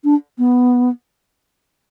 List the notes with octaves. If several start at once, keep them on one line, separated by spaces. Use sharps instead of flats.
D4
B3